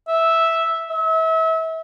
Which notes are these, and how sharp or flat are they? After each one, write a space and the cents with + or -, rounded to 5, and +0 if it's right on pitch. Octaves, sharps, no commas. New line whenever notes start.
E5 -5
E5 -35